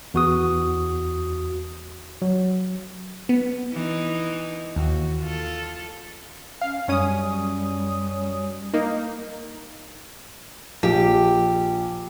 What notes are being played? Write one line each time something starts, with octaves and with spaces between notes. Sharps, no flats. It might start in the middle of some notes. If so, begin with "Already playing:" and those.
E2 F#4 D#6
F#3
B3
E3 D#4
D#2 F#4
F4 A4
C#4 F5
F#2 G3 C#4 D#6
A#3 D#4
A#1 G4